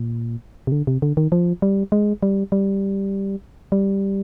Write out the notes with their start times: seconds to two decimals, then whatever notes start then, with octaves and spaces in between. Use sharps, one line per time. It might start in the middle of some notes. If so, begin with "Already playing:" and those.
Already playing: A#2
0.67 C3
0.72 D3
0.87 C3
1.02 D3
1.17 D#3
1.32 F3
1.62 G3
1.92 G#3
2.23 G3
2.52 G3
3.72 G3